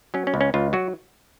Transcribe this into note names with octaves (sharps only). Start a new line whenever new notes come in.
F#3 C#4
C#4
C#2
C#4
C#2 F4
F#3 F#4